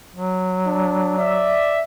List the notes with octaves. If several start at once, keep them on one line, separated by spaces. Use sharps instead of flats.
F#3
D4
D5 E5